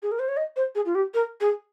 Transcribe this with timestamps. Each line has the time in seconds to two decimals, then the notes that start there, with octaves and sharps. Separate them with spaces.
0.03 G#4
0.12 A#4
0.19 C5
0.28 C#5
0.37 D#5
0.56 C5
0.75 G#4
0.86 F4
0.95 G4
1.14 A#4
1.41 G#4